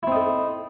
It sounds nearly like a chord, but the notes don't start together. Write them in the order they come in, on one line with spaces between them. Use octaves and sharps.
E4 C4 D#4 A4